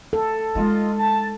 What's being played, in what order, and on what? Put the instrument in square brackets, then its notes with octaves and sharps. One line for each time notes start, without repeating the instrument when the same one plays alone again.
[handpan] A4
[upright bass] G#3 D#4 [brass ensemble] F4 D#5
[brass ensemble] A5